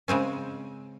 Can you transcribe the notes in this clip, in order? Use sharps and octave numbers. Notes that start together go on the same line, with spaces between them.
C#3 G#3 C4 C#4